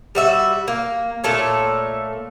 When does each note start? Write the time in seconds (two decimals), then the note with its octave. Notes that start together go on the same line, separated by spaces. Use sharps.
0.15 G3 F#4 E5
0.68 A#3
1.24 A#2 A3 A4 C#5